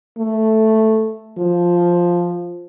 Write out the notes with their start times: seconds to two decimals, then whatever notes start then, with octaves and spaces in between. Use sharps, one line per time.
0.19 A3
1.38 F3